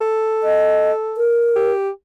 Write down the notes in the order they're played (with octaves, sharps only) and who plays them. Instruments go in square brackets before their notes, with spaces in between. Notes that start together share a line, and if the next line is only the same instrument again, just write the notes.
[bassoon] A4
[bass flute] D#5
A#4
[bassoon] G4